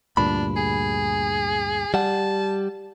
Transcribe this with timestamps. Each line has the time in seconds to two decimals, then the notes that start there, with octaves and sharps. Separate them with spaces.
0.17 D2 G2 A#2 D4 B5
0.56 G#4
1.94 G3 F#5 A5